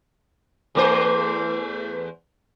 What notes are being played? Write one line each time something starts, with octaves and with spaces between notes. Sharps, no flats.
E2 A3 C5